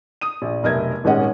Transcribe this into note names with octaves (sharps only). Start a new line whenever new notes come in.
D#6 D#7
A#1
F1 B1 A#4 D#5 E5 G#6
D#1 G#1 G#3 C#4 D#5 F#5